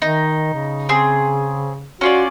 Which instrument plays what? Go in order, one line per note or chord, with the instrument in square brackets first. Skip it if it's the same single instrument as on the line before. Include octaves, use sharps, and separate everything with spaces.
[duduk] D#3 [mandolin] D#4
[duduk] C#3
[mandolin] C4 G#4
[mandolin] C#4 F4 D5 [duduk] F#4